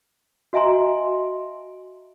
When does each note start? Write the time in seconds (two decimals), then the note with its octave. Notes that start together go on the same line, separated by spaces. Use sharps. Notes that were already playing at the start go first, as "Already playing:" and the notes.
0.53 F#4 D#5 E5 G#5 A#5 C6